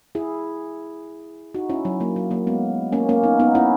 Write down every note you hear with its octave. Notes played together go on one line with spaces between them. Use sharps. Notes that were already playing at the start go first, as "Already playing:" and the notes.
E4 G#4
D#4 F#4
C#4 E4
F#3
F#3 A#3
F#3
F#3 A#3
G#3 B3
A#3 C#4
A#3 C#4
B3 D#4
B3 D#4
C#4 E4